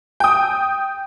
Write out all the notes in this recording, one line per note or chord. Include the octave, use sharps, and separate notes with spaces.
G5 D#6